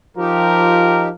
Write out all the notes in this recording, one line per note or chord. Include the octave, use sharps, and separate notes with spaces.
F3 D#4 F4 G4 A#4